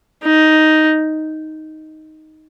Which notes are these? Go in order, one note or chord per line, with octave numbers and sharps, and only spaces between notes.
D#4